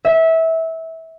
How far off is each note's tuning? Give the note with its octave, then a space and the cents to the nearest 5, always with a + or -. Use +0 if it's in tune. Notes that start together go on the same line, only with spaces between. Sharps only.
E5 -20